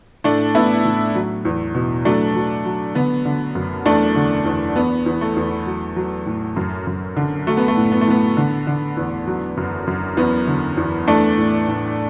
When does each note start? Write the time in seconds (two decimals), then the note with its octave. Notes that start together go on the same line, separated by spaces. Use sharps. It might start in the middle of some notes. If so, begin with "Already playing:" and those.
0.24 A2 A3 D4
0.55 A2 B3 E4
0.85 A2
1.15 F#3
1.45 E2
1.75 B2
2.05 F#3 A3 D4
2.35 F#3
2.65 F#3
2.95 D3 B3
3.25 D3
3.55 F#2
3.86 E2 A3 D4
4.16 D3
4.45 E2
4.76 E2 B3
5.06 E2
5.21 A3
5.36 E2
5.66 F#3
5.96 F#3
6.26 A2
6.56 F#2
6.87 F#2
7.17 D3
7.47 F#3 A3
7.57 B3
7.68 A3
7.77 A2
7.92 B3
8.01 A3
8.07 A2 B3
8.37 D3
8.67 D3
8.97 E2
9.27 F#3
9.57 F#2
9.87 F#2
10.17 E2 B3
10.47 D3
10.77 E2
11.08 E3 A3 D4
11.38 A2
11.68 A2